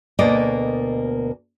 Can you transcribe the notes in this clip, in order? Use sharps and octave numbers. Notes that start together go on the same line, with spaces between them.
D2 B2 A#3 D5 D#5